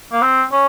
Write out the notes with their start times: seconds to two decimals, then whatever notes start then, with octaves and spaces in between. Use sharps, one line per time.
0.13 A#3
0.22 C4
0.53 C#4